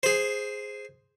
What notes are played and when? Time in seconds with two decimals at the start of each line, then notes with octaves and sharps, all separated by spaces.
0.03 G#4 C5